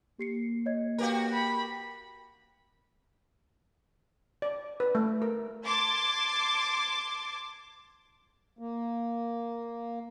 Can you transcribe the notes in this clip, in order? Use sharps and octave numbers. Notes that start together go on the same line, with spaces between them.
A#3 G4 C7 C#7
C#5 D#5 G#6
F#4 G4 A#4 B4 F5
B5
D5
B4
A3
A#4
A5 C6 D6 G#6
A#3